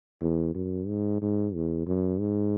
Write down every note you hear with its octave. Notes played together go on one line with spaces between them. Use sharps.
E2
F#2
G#2
G#2
E2
F#2
G#2